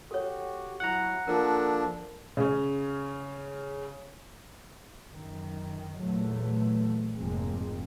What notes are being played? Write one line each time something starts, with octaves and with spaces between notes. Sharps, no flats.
F#4 G4 A4 C#5
F#3 E4 F#4 F#5 A#5
F3 A#3 D4 A4 A#4
C#3 C#4
F#2 D#3
E2 A#2 F#3 A3
F1 G#2 F3 G#3 A#3 C4